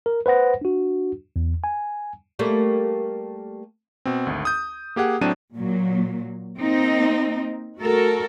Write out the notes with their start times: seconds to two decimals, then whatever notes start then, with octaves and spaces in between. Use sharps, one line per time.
0.06 A#4
0.26 B4 C5 F#5 A#6
0.61 D4 F#4
1.36 E2
1.64 G#5
2.39 G3 A3 A#3
4.05 B2 C4
4.27 G#1 D2
4.45 D#6 G6
4.96 A#3 G4 G#4 F#5
5.21 A2 F#3 C4 D4 D#7
5.55 A#2 F#3
6.60 A#3 C4 D#4
7.79 A3 F#4 A4 A#4